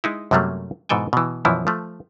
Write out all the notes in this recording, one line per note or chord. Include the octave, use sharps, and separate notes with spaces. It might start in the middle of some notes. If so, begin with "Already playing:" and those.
G#3 D#4 E4
F#2 C3 F#3 G3 A3 A#3
G#2 B2 E3 A4 G5 G#5
B2 E3
F#2 B2 E3 F3 E4
F3 A3